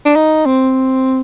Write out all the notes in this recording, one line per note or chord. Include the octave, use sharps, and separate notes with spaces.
D4
D#4
C4